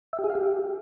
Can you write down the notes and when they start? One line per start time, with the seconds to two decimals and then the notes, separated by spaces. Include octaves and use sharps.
0.13 E5
0.19 G4
0.24 G#4
0.30 F5
0.35 G4